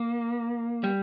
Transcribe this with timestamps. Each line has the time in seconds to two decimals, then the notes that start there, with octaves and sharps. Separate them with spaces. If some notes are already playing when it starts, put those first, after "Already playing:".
Already playing: A#3
0.84 G3